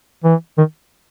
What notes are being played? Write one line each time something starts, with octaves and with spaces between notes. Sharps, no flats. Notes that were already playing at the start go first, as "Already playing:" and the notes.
E3
D#3